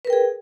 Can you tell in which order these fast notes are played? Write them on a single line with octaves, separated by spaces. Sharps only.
B4 A#4 G5 G#4